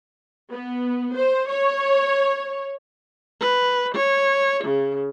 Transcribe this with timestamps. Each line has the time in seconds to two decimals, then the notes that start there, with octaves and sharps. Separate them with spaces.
0.52 B3
1.15 C5
1.48 C#5
3.40 B4
3.94 C#5
4.63 C#3